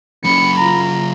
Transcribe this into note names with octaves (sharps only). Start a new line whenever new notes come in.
F#2 C#3 B5 C#7
F4 A#5